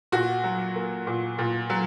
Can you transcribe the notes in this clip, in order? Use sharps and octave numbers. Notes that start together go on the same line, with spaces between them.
A#2 F#4
F#3
A#3
A#2
A#2
F#3